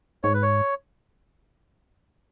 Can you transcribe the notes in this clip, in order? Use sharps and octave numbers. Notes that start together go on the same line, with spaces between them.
G#2 C#5
B4
C#5